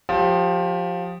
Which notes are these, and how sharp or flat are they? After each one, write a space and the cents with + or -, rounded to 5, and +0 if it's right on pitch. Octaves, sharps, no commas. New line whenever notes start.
F3 +20 G4 +0